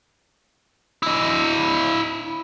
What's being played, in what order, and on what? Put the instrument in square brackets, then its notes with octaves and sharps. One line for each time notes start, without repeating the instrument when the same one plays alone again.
[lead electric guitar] E4 D#5